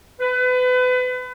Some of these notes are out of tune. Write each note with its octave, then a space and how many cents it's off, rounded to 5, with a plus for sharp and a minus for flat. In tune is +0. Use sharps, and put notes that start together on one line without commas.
B4 +30